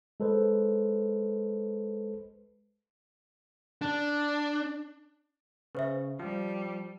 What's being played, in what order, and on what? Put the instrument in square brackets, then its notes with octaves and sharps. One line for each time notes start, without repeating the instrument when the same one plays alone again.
[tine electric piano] G#3 A4 B4 C5 D#5
[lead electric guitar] D4
[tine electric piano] C#3 [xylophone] B4 C5 E5
[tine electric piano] F3 [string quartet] G3